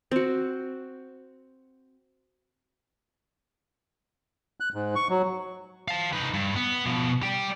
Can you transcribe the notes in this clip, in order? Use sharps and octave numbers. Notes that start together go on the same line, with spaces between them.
C4 F#4
F#6
G#2
C#6
F#3
F5 A5
D#4 B4
G2
B3
B2 F3
G4 D5